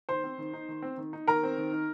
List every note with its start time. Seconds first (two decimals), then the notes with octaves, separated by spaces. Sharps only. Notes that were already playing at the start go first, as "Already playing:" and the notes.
0.09 D#3 C5 C6
0.24 C4
0.38 D#3
0.53 D#4
0.69 D#3
0.82 C4
0.97 D#3
1.13 D#4
1.27 D#3 A#4 A#5
1.43 C4
1.58 D#3
1.72 D#4